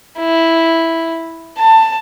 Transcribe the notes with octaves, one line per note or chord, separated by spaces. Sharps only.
E4
A5